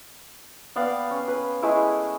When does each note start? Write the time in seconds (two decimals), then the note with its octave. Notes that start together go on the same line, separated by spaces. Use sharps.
0.76 B3 D5 F5 G5
1.11 C#4
1.28 B4
1.62 G#3 A3 E4 G#5